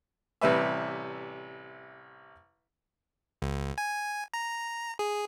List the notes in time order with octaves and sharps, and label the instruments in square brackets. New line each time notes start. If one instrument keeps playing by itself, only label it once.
[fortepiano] A1 C3 G3 B4 E5
[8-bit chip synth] C#2
G#5
A#5
G#4